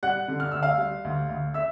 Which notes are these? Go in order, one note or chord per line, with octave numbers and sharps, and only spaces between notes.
G3 F#5 F#6
D3
F6
D2 E6
F5 F6
G3
D2
D2
E5 E6